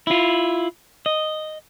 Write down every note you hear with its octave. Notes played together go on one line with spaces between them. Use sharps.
E4 F4
D#5